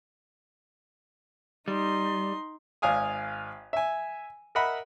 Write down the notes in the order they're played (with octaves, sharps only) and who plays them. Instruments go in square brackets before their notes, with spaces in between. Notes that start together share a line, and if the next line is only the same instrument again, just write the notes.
[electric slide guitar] G3 [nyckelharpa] D#4 C6
[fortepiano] G#1 D5 F5 G#5 D#6
E5 G#5
A#4 D#5 E5 F#5 B5